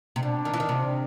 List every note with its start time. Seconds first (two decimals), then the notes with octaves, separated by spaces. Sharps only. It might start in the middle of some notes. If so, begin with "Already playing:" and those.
0.16 C3
0.23 B2 D4
0.45 D#3
0.54 E3
0.60 D#3
0.69 C3